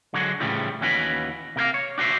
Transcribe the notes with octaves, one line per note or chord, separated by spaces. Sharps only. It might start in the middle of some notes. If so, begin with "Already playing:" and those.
D3 F#3 G#3 F#4
A2 C#3 E3 F3 G3
D#2 E3 C#4 F#4 B4 B5
C3 A#4 C5 F5
C#5
D4 F#4 G#4 C5 E5